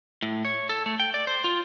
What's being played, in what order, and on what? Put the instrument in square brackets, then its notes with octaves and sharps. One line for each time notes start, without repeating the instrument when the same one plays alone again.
[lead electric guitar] A2
C#5
A4
A3
G5
D5
C5
F4